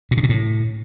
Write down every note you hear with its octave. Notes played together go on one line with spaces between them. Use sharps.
A#2
C#3
B2
A2